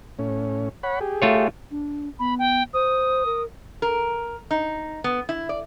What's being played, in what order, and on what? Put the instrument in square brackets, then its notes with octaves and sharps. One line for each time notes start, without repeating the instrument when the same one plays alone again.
[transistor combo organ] A2 C#4
C#5 F#5 B5
G4 G#4
[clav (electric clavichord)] A3 F4 C#5
[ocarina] D4
[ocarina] B3 [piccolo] B5
[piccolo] G5
[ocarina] C5 [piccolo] D#6
[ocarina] A#4
[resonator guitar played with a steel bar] A#4
D#4
B3
E4
D5